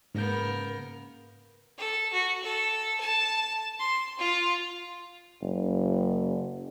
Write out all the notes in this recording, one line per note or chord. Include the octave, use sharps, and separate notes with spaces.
G#2 C#3 A#3 B3 A#4 G6
A4
F#4
A4
A5
C6
F4
F#1